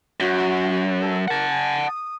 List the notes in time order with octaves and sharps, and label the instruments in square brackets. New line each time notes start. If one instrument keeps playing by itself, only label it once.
[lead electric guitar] F#2 [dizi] F#4
[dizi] A4
[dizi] A#4 [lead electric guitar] F#5 A5
[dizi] G#5
D#6